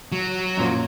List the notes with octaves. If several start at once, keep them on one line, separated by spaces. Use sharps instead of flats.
F#3
F#2 A#2 F3